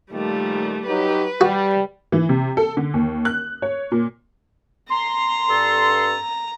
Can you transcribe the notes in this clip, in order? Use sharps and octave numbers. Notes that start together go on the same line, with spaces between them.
A#2 D#3 F3 G3 A3
F#3 D#4 G4 B4
G3 F#4
E3
C3
A4
D3
D#2
F#6
C#5
A#2
A#5 C6
G2 A4